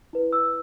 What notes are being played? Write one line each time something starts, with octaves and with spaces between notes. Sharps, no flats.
E4 B4
E6